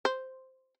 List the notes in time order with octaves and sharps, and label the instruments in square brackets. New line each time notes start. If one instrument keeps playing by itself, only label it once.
[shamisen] C5